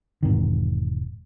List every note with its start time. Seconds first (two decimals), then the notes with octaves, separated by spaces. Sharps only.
0.23 E1 G#2 D#3